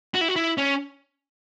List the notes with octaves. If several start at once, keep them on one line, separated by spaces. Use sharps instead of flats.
F#4
E4
F#4
E4
C#4